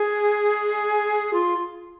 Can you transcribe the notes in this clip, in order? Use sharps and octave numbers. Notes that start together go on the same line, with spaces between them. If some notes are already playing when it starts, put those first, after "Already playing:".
Already playing: G#4
F4